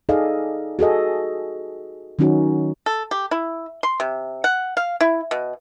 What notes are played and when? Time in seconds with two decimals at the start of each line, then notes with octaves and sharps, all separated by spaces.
0.09 D#4 G#4 A4 D5 D#5 F5
0.79 F#4 G#4 A4 D#5
2.19 D#3 F#3 C#4 D#4 F#4
2.86 A4
3.11 G4
3.31 E4
3.83 C6
4.00 C3
4.44 F#5
4.77 F5
5.00 E4
5.31 B2